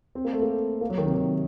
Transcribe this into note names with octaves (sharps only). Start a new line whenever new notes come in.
C4
A#3
A3
A#3
A#3
F#3
D#3
C3
D#3